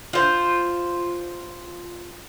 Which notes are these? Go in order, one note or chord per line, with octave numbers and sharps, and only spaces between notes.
F4 C5